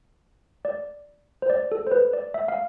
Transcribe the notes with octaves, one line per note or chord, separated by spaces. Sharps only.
D5
C5
D5
A4
C5
B4
D5
E5
F5